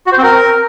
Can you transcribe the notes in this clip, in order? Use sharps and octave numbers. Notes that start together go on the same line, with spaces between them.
F#4
C5
C4
A#4